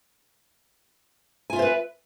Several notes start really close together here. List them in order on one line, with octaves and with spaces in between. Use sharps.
G#5 F4 E5 C5 B4